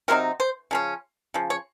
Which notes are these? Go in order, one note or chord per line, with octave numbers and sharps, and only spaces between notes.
C3 F#3 C4 D#4 A#4
C5
C#3 F3 C#4
C#3 F3
C#5